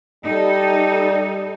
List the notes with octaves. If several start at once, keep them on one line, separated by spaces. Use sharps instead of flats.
G3 D#4 A4